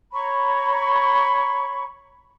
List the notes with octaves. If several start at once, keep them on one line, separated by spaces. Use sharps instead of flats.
C#5 A#5 B5 C#6